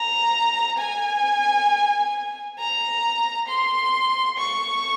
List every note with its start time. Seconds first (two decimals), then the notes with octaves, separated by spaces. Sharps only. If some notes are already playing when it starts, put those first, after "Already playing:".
Already playing: A#5
0.79 G#5
2.59 A#5
3.48 C6
4.39 C#6